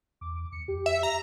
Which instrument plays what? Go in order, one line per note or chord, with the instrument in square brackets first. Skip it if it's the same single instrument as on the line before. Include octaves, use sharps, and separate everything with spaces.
[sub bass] E2 [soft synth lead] D6
[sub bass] D#2 [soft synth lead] C#7
[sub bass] F2 [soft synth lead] G4
[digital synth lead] E5
A#5